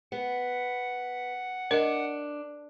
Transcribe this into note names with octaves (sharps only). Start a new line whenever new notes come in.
B3 F#5
D4 A#4 D#5